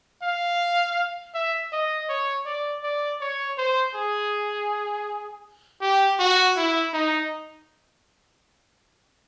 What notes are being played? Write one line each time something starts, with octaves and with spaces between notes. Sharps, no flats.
F5
E5
D#5
C#5
D5
D5
C#5
C5
G#4
G4
F#4
E4
D#4